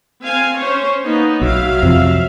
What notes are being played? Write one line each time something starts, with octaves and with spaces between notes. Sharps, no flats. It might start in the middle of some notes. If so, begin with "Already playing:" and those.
C4 F5 G#5
C#4 C5 C#5
A#3 B3 D#4
B1 F#3 E5 F5
F2 C3 F3